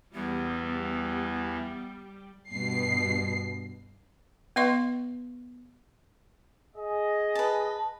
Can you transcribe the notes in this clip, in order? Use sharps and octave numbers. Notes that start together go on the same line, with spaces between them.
E2 E3 G3 B3
G2 B2 C7
B3 B4 D#5 F5 C6 C#6
G#4 D#5
B4 A5